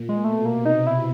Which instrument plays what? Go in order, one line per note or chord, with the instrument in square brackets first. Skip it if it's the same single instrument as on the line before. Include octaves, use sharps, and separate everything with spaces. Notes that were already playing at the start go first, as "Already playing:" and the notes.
Already playing: [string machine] A#2
[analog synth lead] G#3
[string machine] B2 [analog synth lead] A3
[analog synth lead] A#3
[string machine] C3
[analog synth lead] D#4
E4